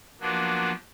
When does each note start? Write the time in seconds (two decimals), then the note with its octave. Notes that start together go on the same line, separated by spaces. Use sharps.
0.21 F3 F#3 A#3 B3 D4